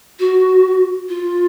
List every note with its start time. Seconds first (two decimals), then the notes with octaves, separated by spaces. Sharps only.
0.19 F#4
1.09 F4